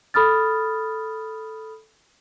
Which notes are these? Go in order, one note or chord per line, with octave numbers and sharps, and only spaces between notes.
A4 B5 D#6 F6 A6